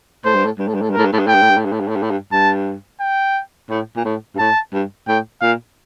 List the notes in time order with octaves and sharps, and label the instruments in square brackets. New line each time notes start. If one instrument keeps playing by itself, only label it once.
[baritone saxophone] A2 [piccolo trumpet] C5
[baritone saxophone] G2
A2
G2
A2
G2
A2
G2
[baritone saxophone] A2 [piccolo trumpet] A#4
[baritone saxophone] G2
A2
G2
[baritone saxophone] A2 [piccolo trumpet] G5
[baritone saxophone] G2
A2
G2
A2
G2
A2
G2
A2
G2
A2
G2
[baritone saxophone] G2 [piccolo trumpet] A5
[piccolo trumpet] G5
[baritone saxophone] A2
A#2
A2
G2
[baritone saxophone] A2 [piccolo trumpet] A5
[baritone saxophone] G2
[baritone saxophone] A2 [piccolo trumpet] G5
[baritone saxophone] A#2 [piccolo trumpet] F5